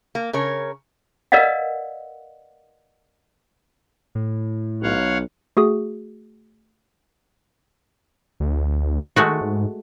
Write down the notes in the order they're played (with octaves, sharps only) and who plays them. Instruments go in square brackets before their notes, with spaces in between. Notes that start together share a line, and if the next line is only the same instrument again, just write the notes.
[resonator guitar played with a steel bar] A#3
C#3 A#4 C#5
[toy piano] A#4 B4 D5 D#5 F5 F#5
[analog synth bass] A2
[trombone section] B1 [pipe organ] C#5 F5 F#5
[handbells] A3 F#4 G#4 D#6
[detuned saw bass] D2
[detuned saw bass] D#3 [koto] G#3 A3 F#4
[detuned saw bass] G#2